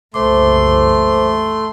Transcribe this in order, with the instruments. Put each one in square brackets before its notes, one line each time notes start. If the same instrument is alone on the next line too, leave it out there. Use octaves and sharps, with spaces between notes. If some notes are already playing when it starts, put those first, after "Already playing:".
[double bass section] F#1 C2 E3 [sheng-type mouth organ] A3 C6 [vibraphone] C5 D6